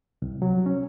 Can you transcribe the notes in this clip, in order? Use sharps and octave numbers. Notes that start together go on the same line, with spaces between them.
C2
F#3
C#4